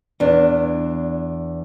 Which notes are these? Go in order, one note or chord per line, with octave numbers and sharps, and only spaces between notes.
E2 D4